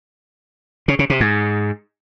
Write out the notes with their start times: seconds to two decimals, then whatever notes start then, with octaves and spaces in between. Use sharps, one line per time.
0.88 C#3
0.99 C#3
1.10 C3
1.20 G#2